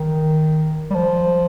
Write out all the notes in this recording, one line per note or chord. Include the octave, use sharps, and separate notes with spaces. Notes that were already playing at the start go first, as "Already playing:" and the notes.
Already playing: D#3
G3
F3